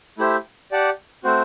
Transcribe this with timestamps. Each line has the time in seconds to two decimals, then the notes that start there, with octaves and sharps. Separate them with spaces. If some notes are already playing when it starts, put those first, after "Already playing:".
0.18 A3 E4 G4 C5 E5
0.72 G4 D5 F#5 A5
1.24 A3 C4 F#4 C5